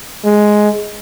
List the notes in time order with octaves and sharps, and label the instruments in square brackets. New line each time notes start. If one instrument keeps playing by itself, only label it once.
[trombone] G#3